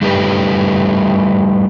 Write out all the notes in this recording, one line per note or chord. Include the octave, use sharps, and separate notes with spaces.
G3 A3 D#4 G4 B4